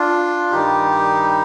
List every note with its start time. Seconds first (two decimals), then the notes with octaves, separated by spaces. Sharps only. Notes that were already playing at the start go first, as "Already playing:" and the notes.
Already playing: D4 F4
0.51 G2 D#3 G3 D#4 G4